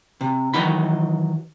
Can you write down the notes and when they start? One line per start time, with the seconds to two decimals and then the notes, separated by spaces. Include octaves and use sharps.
0.21 C3
0.54 D#3 E3 F#3 D#4 B5